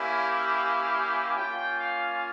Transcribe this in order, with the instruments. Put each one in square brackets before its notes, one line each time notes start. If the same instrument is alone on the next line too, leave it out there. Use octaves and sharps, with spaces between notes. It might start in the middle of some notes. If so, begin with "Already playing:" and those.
Already playing: [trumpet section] A#3 C#4 E4 G4
F5
A#3 C#4 F4 G5
F5